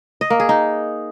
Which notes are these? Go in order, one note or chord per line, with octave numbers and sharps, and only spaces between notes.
D#5
A#3
G#4
D#4